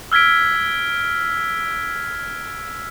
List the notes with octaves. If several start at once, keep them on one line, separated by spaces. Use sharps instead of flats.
E6 F6 G#6 B6 D7